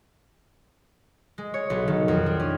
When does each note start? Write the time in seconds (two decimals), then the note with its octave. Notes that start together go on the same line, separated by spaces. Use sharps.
1.38 G#3
1.54 C#5
1.70 B1
1.88 D#3
2.08 F2
2.26 D4
2.40 C#4